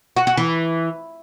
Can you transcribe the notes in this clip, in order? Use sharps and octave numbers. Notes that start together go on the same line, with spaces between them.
F#4
F#4
E3